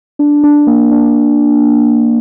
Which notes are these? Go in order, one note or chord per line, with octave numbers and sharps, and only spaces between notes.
D4
D4
A#3
D4